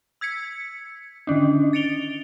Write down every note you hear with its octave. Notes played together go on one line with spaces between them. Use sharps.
E6 G#6 B6 C#7
D3 D#3 C#4 D4
A6 C#7 D7 F7 G7